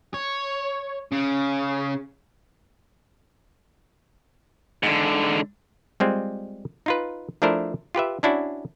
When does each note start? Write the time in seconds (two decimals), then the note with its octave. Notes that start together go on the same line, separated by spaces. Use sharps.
0.14 C#5
1.12 C#3
4.83 G#2 D3
6.00 G3 G#3 C4 F4
6.86 D#4 F4 B4
7.42 F3 A3 D4 E4 A#4 C5
7.95 F4 G4 B4 E5
8.23 C#4 D4 E4 F#4